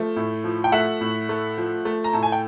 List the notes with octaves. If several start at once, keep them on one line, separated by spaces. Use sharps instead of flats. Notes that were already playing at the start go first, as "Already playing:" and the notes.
Already playing: F3 A3
A2
F3
G5
A3 E5 F#5
A2
A3
F3
A3
A#5
A2 A5
G#5
G5